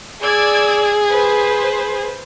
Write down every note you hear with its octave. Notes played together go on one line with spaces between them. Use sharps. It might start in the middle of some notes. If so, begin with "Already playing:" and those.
G#4 D5 E6 G#6
B4 C5